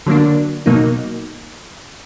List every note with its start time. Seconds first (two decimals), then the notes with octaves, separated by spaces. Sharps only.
0.06 D3 F#3 A#3 D4
0.66 B2 F#3 A#3 D#4